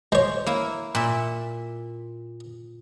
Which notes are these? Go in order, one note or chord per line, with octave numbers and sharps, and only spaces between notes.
G#3 C5 C#5
A#3 E4
A#2 E5